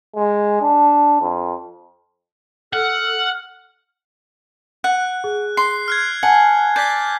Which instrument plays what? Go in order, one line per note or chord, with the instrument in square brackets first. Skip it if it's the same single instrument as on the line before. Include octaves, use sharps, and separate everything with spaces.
[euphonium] G#3
D4
F2
[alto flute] A4 [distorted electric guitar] F#5 [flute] F6
[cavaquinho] F#5 [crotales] F#6
[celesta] G#4
[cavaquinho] C6 [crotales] C7
[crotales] F6 F#6 G#6
[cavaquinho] F#5 [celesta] G#5 A5
[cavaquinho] D5 [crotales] G6 B6